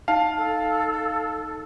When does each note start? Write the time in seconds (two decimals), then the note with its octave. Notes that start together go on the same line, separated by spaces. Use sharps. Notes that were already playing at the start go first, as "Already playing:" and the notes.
0.08 D#4 F5 A5
0.38 A4